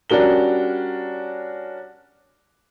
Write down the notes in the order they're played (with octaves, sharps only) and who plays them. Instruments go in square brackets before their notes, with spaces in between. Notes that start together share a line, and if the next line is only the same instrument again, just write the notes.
[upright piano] G3 C#4 D4 F#4 A#4 G7